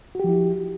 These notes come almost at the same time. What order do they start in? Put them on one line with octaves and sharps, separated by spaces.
F#4 G4 F3 E4